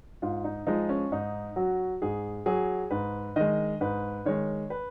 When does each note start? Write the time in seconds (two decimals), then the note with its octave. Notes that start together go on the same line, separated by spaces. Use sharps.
0.22 G#2 F4
0.44 D#4
0.67 F3 G#3 D#4
0.89 C#4
1.12 G#2 D#4
1.56 F#3 F#4
2.02 G#2 G#4
2.46 F#3 G#4
2.91 G#2 B4
3.36 D#3 G#3 D#5
3.81 G#2 B4
4.25 D#3 G#3 C#5
4.70 B4